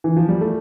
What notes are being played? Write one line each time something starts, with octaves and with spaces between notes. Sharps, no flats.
E3
F3
G3
A3